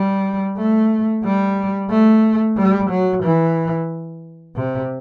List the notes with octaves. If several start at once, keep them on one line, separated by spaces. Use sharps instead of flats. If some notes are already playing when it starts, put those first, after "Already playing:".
Already playing: G3
A3
G3
A3
G3
F#3
E3
C3